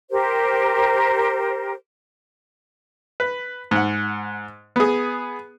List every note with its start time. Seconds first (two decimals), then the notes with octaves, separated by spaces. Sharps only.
0.11 G4 A#4 C5
3.20 B4
3.71 G#2 F#5
4.76 B3 G#4